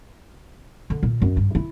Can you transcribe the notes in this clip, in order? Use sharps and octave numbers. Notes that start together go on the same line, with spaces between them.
D3
A#2
F#2
G2
E4